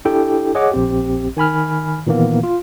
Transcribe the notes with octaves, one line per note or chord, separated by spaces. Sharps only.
D4 E4 G4 A4 G5
G#4 C#5 D#5 F#5 D6
A#1 C4 G4
D#3 G#5 B5 F6
A#2 D#3 E3 A#3 B3
F4